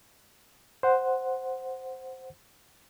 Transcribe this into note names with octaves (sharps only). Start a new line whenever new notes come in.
C5 F#5